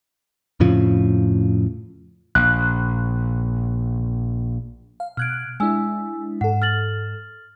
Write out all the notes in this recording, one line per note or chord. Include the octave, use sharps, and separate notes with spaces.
F2 A2 C#3 F3
A#1 F#6
F5
B2 F6 F#6 G#6 D7
G#3 D4 E4 G#5 E6
G#2 A4 F#5
F6 A6 F#7